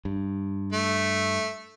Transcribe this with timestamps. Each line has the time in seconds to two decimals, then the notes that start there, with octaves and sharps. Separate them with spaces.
0.05 G2
0.73 A3